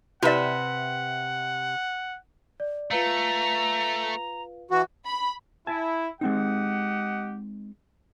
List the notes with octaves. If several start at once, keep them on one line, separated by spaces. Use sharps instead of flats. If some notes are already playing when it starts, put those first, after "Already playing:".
C3 E4 G4 B4 D5 E5 F#5
D5
A3 F4 B4 F5 A#5
E3 F#4
B5
E4 G#5 A5
G#3 C4 D#4 G4 D#5 F#5